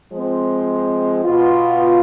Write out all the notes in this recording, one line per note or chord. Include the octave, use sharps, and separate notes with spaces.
F3 G#3 C4
B2 B3 F4